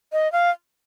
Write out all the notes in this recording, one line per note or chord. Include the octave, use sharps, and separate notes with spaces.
D#5
F5